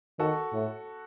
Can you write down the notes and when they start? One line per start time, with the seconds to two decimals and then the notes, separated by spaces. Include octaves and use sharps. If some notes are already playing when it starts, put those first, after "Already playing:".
0.19 D#3 F#4 A4
0.53 A2